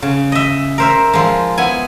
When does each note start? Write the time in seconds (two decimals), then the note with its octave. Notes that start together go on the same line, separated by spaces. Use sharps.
0.02 C#3
0.32 D#5 E5
0.78 A#4 C5 E5
1.13 F3 G#3
1.58 B3 E4 G#5